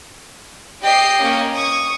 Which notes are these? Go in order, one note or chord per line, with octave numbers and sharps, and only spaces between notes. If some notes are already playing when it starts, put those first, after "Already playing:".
G4 D#5 G5 C7
A#3 C#4
C#6 D#6